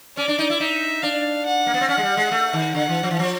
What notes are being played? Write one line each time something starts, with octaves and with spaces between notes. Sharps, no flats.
C#4 D5
D4
D#4
E4
D#4 E5
D4 F5
F#5
A#3
B3
C4
C#4 F#5
G#3
G3
G#3
A3
D#3
D3 F#5
E3
F3
E3
F3